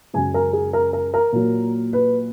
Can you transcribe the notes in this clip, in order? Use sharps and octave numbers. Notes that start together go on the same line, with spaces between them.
F#2 C#3 G#3 G#5
A#4
G#4
A#4
A#4
A#4
A#2 F#3
B4